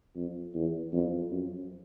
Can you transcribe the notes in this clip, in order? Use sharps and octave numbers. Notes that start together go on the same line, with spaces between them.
F2
E2
F2
F#2